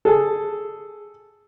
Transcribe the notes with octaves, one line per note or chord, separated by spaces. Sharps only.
G#4 A4